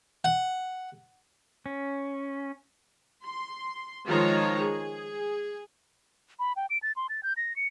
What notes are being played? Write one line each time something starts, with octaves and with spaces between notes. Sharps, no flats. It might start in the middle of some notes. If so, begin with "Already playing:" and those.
F#5
C#4
C6
D#3 F3 G#3 F4 C#5 A#5
G#4
B5
G5
D7
A6
C6
A6
G6
A#6
C#7